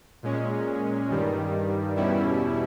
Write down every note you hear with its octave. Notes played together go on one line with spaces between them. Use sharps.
A#2 G#3 C#4
G2 D#3 G3
E2 B2 G3 C#4 E4